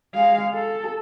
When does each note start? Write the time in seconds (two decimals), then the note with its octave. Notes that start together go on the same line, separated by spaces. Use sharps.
0.14 G#3 F5
0.54 A4